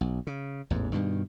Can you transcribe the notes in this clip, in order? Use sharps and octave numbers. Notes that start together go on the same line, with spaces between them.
B1
C#3
A1 E2 G#2
G2 B2 D#3